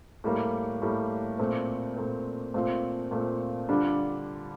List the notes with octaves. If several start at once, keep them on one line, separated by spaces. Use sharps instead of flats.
A2 G3 A#3
A2 G3 A#3
A#2 A3 C4
A#2 A3 C4
A#2 A3 C4 F4
A#2 A3 C4 F4
D3 G3 D4 F4